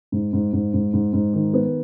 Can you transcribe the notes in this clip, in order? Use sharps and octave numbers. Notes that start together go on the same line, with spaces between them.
G#2
G#2
G#2
G#2
G#2
G#2
D#3
B3